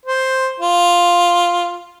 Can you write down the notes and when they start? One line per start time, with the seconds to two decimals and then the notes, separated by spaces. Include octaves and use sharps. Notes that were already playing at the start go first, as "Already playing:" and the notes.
0.05 C5
0.60 F4